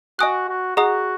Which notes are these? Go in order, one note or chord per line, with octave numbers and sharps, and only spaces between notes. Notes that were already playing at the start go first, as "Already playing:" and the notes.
F#4 D#5 G#5 D#6 F#6
F#4
F#4 G#4 D#5 F#5 A#5 D#6